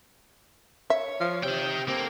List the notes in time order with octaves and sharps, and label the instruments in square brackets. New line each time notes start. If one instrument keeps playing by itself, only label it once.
[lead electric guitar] C#5 [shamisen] E5
[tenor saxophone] F3
[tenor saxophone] C3 [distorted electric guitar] D#4 G5
[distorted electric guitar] A#3 [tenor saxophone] C4 [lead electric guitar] G4 A4